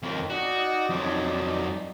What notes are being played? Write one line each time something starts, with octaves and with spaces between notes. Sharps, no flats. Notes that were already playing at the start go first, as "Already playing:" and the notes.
F2 D#3
D#4 F#4 D5
F2 F#3